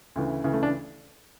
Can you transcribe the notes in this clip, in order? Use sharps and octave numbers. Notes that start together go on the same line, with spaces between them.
D2 C#3 E3
D2 C#3 E3
A3
D4